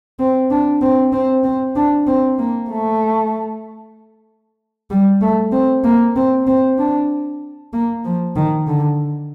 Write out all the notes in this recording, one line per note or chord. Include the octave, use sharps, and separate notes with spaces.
C4
D4
C4
C4
C4
D4
C4
A#3
A3
G3
A3
C4
A#3
C4
C4
D4
A#3
F3
D#3
D3